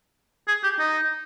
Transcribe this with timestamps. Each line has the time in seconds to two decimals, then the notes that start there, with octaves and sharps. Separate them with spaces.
0.48 G#4
0.64 G4
0.79 D#4